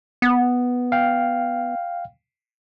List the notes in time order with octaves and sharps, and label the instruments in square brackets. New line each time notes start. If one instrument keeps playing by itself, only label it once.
[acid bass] B3
[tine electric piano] F5 G5